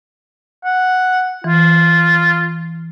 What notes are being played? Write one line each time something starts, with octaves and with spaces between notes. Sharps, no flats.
F#5
E3 F4